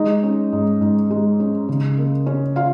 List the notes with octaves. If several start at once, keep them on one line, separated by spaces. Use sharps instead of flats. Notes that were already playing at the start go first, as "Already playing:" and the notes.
Already playing: G#3 D#4 D#5
C#4
G#2
G#2
G#3
C#4
C#3
A#3
C#4
F4 F5